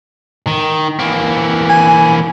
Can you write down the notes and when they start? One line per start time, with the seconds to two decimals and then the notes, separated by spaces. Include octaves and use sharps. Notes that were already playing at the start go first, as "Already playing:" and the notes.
0.47 D#3
0.99 E3 A#3
1.69 G#5